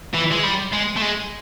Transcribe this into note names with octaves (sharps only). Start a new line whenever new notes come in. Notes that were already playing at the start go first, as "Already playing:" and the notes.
E3
G#3
G3
G#3
A3
G#3